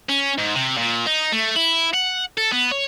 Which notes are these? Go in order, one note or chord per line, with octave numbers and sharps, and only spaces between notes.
C#4
G#2
C3
A#2
D#4
A3
E4
F#5
A4
B3
C#5